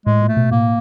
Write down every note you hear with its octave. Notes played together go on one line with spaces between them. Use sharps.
A2 G#3
A#2
A3
B2
A2 A#3